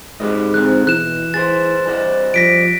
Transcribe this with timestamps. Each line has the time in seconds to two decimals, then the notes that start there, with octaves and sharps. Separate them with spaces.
0.20 G#2 G4 B4 D#5
0.54 D3 C4 A#4 F#6
0.87 B2 E3 F#6 E7
1.34 G#4 C5 A6
1.86 G3 C5 D#5
2.34 F3 A#6 B6 D7